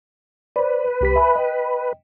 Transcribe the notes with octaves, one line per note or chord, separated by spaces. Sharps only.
B4 C5 D5
C2 G4 B6
E5 G#5 B5
D#5 G5